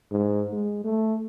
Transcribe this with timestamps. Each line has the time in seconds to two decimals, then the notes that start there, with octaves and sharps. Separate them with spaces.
0.11 G#2
0.53 G#3
0.84 A3